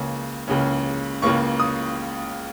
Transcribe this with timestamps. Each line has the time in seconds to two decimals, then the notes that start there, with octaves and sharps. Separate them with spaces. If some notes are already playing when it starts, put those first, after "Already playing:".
Already playing: C#2 C#3 A#3 C#4
0.48 C#2 C#3 A#3 C#4
1.22 C#2 C#3 A#3 C#4 C#6
1.60 D#6